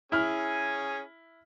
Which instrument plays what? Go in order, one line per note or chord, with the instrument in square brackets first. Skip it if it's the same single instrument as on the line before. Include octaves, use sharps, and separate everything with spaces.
[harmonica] C#4 G#4 G#5 [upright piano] E4 F6